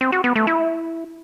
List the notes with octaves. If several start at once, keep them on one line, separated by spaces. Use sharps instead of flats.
C4
F#4
B3
A3
E4